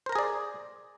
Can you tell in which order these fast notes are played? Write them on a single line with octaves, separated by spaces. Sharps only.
C5 A#4 A#5 G#4 D5